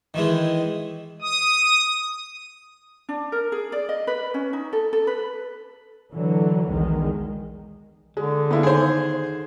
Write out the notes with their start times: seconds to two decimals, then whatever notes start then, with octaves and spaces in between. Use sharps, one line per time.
0.14 D#3 E3 G#3
1.22 D#6
3.09 D4
3.32 A#4
3.52 G#4
3.72 D5
3.89 D#5
4.07 B4
4.34 C#4
4.53 D#4
4.73 A4
4.93 A4
5.07 B4
6.12 D3 E3 F#3
6.68 B1 E2 D#3 G#3
8.17 D3 G#3
8.51 B3 E4 F4
8.63 D#3 G#4 C5